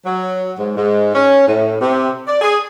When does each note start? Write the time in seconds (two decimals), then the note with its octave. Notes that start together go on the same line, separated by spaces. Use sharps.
0.06 F#3
0.59 G#2
0.76 G#2
1.15 C#4
1.47 A2
1.81 C3
2.27 D5
2.41 G#4